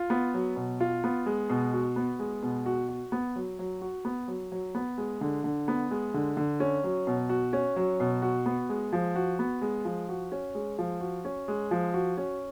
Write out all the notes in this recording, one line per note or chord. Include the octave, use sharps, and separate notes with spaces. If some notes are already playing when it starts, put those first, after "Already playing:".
Already playing: F4
B3
F#3
B2
F4
B3
G#3
B2
F#4
B3
G#3
B2
F#4
F#4
B3
F#3
F#3
F#4
B3
F#3
F#3
B3
G#3
D3
D3
B3
G#3
D3
D3
C#4
F#3
B2
F#4
C#4
F#3
B2
F#4
B3
G#3
F3
F#4
B3
G#3
F3
F#4
C#4
G#3
F3
F#4
C#4
G#3
F3
F#4
C#4